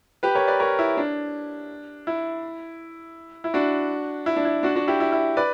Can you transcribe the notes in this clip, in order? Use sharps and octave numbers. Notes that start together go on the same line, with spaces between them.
G4 B4
A#4 C#5
B4 D5
A#4 C#5
E4
D4
E4
E4
D4 F#4
E4
D4
E4
D4 F#4
D4 F#4
E4 G4
E4
E4
B4 D5